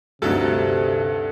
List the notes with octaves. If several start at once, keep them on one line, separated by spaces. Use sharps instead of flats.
D2 G2 C3 D#4 F#4 A4